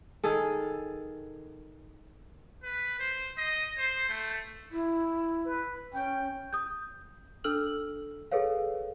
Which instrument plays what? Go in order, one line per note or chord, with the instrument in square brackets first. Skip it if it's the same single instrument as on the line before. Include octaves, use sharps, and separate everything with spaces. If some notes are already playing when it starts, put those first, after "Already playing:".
[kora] D#3 G#4 A4
[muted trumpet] B4
C5
D#5
C5
A3
[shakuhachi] E4
[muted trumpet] B4
[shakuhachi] C#4 [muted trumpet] G5
[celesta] D#6 G6
D4 A4 E6 F6 F#7
G#4 A4 B4 C#5 F5